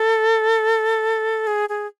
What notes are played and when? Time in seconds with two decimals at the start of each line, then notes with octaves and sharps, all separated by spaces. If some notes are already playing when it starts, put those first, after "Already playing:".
Already playing: A4
1.47 G#4
1.69 G#4